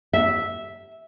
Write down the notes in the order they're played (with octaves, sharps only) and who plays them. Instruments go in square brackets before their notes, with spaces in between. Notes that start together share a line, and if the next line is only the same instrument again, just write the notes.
[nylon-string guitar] E5